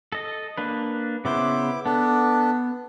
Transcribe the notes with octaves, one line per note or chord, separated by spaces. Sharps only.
A4 D#5
A#3 D4 B4
C#3 B3 E4 C5 D6
B3 D4 A4